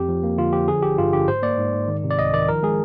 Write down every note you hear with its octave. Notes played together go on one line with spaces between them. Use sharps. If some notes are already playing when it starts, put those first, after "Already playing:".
Already playing: F2 G4
F3
A#3
D3 F4
F3 G4
D3 G#4
G#1 G4
G2 F4
D3 G4
G#2 C5
A#3 D5
G#2
G#2
D#3
C3
D5
C2 D#5
D#3 D5
F3 A#4
G#3 G#4